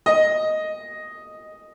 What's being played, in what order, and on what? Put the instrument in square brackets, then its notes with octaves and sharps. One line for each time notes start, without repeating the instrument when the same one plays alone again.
[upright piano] D#5